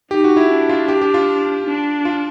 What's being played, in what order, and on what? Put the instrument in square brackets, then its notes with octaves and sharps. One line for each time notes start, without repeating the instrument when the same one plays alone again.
[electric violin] D#4 [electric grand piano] G4
[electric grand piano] F#4
E4
[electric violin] D4
[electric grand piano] F4
G4
G4
F4
[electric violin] D4
[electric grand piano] F4